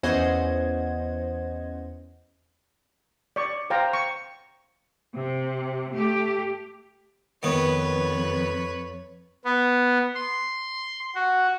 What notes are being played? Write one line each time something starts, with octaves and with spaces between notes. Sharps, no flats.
E2 C#4 C5 D#5 F#5 G#6
D5 C#6
C5 F5 G5 A#5
C#6
C3
A3 G4
F2 D#3 B3 B4 C#5
B3
C6
F#4